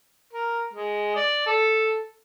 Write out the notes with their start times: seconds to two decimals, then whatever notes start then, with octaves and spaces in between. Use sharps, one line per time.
0.33 A#4
0.73 G#3
1.16 D5
1.46 A4